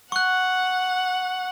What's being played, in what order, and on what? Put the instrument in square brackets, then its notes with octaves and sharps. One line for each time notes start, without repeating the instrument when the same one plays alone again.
[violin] F#5 [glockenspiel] C#6 F#6